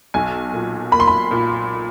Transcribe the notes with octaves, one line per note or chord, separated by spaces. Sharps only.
B1 G#5
A#2
A#3 B5
C6
B5
A#2